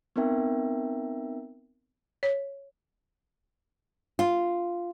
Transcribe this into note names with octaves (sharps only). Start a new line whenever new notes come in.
B3 C4 D#4 A#4 E5 G5
C#5
F4